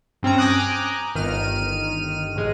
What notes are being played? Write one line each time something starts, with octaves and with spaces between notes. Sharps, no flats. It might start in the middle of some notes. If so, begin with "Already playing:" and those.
G2 C4 C#4 A#5
G5 G#5 A#5 D6 D#6 F#6
G1 D#3 F6 D#7
A1 G#3